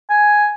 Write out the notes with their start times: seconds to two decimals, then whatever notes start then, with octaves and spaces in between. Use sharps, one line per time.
0.10 G#5